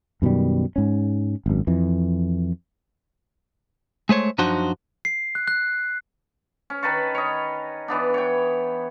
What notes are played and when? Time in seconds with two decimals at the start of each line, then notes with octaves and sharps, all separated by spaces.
0.22 F#2 B2 D#3 G3
0.76 G#2 C#4
1.46 G#1 F#2
1.67 F2 E3
4.09 G#3 A3 C5 C#5
4.38 F#2 F3 D4 D#4 F#4 C5
5.05 C7
5.35 F#6
5.48 F#6
6.70 C#4
6.83 D#3 B4 A5 C#6
7.15 C#5 D#5
7.88 E3 B3 D4
8.14 C#5 G5